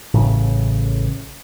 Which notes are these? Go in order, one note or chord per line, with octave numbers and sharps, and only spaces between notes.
A1 A2 C#3